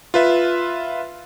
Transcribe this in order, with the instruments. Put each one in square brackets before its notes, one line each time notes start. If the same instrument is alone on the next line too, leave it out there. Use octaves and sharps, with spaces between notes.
[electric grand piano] F4 B4 E5